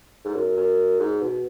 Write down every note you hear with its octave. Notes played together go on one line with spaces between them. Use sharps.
G#2
F#2
F#2
G#2
B2